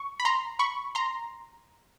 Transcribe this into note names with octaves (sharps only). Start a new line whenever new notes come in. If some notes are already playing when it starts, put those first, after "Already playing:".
Already playing: C#6
B5
A#5 C6
B5 C#6
A#5 C6